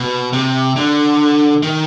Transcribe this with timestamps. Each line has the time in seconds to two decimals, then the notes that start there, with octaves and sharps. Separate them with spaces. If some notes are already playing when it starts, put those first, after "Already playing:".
Already playing: B2
0.33 C3
0.76 D3
1.63 D#3